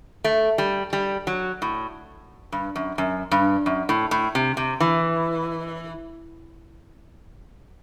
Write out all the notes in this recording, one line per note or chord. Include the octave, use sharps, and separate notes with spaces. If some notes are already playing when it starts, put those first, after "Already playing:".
A3
G3
G3
F#3
A2
G2
F#2
F#2
G2
F#2
A2
A2
C3
C3
E3